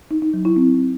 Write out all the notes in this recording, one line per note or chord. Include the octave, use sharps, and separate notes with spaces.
D#4
D#4
F#3
E4
C4